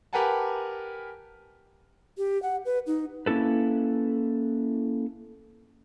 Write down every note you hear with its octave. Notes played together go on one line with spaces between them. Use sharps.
G4 A#4 B4 F#5 G#5 A5
G4
F#5
B4
D#4
A#3 C#4 E4 A4 B4